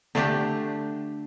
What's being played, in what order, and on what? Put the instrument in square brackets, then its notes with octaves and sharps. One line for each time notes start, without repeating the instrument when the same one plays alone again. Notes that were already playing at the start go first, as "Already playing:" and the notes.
[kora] D3 A3 D4 G4